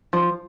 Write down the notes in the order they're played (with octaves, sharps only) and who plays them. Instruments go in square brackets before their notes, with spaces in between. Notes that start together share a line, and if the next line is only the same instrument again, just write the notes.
[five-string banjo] F3